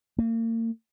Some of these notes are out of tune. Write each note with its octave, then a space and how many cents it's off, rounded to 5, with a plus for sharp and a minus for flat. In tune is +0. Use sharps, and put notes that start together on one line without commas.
A#3 -40